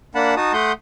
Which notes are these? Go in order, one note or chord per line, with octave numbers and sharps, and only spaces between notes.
A#3 D4 F#5 A5 B5
D#4 F#4 A5 D#6
A3 F#5 C6 D#6 G6